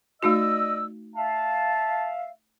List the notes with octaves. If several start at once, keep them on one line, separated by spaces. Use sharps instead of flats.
A3 D#4 F#4 D5 D#5 E6
E5 F5 A5